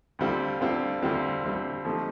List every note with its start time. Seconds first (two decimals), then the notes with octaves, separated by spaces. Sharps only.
0.19 D2 D3 G3 C4 F4
0.61 D2 D3 G3 C4 F4
1.02 D2 D3 G3 C4 F4
1.44 D2 D3 G3 C4 F4
1.85 F3 A3 C4 D#4 G4